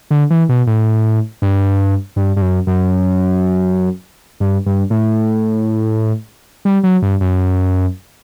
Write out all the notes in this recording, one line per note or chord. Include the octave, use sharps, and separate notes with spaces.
D3
E3
B2
A2
G2
G2
G2
F#2
F#2
G2
G2
A2
G3
F#3
G2
F#2